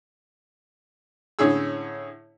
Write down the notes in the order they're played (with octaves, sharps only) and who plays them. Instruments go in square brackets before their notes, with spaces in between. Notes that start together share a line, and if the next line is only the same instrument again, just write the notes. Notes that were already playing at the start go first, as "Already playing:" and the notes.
[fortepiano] A2 D3 C#4 E4 G#4 E6